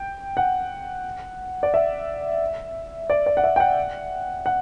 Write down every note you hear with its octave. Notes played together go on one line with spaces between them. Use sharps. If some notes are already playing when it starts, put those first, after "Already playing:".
Already playing: G5
F#5
D5
E5
D5
D5
F#5
E5
G5
F#5
F#5